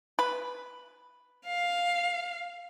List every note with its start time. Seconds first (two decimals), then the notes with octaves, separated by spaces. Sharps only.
0.19 B4
1.46 F5